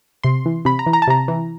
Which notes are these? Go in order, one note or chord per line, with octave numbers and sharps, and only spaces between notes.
C3 C6
E3
C3 B5
A#5
E3
A#5
A5
C3 A#5
E3